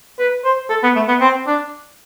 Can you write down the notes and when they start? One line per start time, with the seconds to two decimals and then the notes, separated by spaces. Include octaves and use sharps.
0.19 B4
0.44 C5
0.70 A4
0.83 B3
0.96 A3
1.08 B3
1.21 C4
1.47 D4